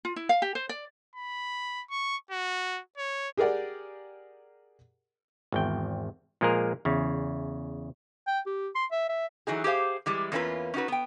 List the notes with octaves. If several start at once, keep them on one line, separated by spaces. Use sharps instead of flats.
F4
E4
F5
G4
C5
D5
B5
C#6
F#4
C#5
G4 G#4 A#4 D5 F#5
G#1 E2 G5
A#2 F3 G#3 A#3 G#4 A#4
E2 C#3
G5
G4
C6
E5
E5
E3 F#3 D#4 G#4
G4 G#4 C5 F5
E3 G3 G#3
E2 A#3 C#4 D4 F4 B4
C#4 D#4 F#4 B4
B3 G5